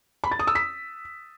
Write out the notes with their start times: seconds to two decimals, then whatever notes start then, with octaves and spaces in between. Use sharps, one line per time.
0.24 B5
0.32 A6
0.39 D#6
0.47 E6
0.55 B6